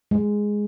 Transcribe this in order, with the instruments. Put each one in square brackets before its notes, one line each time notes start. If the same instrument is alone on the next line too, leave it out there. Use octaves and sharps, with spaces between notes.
[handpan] G#3